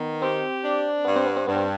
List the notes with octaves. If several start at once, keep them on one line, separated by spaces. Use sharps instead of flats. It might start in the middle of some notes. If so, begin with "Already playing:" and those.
Already playing: D#3 B3
C4 G4
D4
G2 B3
C4
B3
C4
G2 B3
C4